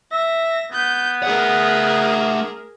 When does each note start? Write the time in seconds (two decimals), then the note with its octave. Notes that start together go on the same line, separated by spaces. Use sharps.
0.12 E5 A#6
0.72 B3 G6
1.23 A3 G#4 A#4 F#5